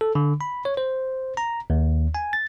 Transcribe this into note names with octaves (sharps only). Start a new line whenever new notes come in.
A4
D3
B5
C#5
C5
A#5
D#2
G#5
A6